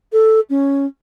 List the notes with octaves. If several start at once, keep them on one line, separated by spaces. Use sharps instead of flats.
A4
C#4